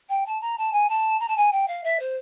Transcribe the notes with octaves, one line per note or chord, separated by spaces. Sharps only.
G5
A5
A#5
A5
G#5
A5
A#5
A5
G#5
G5
F5
E5
C5